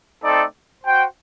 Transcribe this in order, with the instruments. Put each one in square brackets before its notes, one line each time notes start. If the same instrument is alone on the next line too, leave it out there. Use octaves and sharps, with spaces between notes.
[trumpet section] A3 C4 D#4 A4 D5
F#4 C5 G5